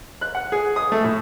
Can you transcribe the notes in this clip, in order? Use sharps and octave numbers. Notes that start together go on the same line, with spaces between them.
F#6
F#5
G#4
D#6
A3
A2